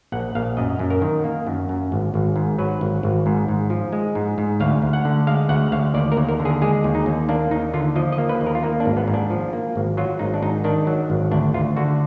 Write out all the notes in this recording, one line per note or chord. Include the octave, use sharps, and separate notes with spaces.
A#1 F#5
A#1 F5
F#2 D#5
F#2
A#4
D#3
A#3
F#2
F#2
G#1
G#1
G#2
F#3 B4
G#1
G#1
G#2
G#2
F3
G#3
G#2
G#2
D2 F5
D2
F#5
D3
G#3 F5
D2 F#5
D2 F5
D#2 D5
A#4
D#2
A#4
D3
G#4
G#3 G#4
D#2
D#4
D#2
A#3 D4
D#2 D#4
D3 F4
F3 D#5
D#5
A#3
B4
D#2
A#4
F4
A#3 D#4
D4
G#1
B3
G#2
D4
F3
A#3
G#1
F#3 F4
G#1 D#4
D4
G#2 D#4
D#3 D4
F#3
G#1
D2 D4
D2 F4
D3 F#4